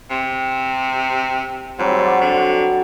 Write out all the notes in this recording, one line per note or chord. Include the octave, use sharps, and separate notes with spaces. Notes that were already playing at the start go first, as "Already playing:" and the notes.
C3
G#2 F#3 G3 C4
F#4 D5 C6
D3